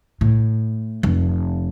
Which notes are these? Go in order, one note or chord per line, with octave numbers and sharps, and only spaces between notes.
A2
F1